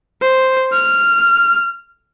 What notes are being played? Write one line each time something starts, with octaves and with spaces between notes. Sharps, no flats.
C5
F6